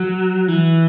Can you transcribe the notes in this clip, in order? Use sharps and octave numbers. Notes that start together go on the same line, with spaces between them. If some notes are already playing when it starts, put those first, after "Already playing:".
Already playing: F#3
E3